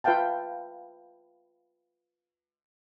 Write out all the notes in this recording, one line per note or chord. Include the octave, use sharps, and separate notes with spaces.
F4 B4 E5 F5 G5 A5